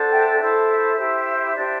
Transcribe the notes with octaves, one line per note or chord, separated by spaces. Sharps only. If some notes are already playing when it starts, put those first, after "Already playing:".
Already playing: D4 F#4 A4 C5
E5 G5
E4 A4 C5
E5
E4 G4 C5
D4 G4 C5